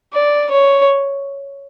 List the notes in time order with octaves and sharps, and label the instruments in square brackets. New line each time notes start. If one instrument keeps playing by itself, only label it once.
[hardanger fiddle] D5
C#5